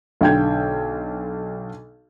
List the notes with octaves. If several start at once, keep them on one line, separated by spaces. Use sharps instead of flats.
B1 D3 G5 G6 G#6